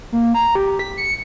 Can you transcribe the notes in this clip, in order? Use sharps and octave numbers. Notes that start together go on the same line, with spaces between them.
A#3
A#5
G4
B6
C#7